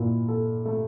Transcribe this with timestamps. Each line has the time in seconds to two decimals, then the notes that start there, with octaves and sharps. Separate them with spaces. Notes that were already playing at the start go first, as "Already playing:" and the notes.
Already playing: A#2 E4
0.28 A4
0.65 A3